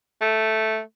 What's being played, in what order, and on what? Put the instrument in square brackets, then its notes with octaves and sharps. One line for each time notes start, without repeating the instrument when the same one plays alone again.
[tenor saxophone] A3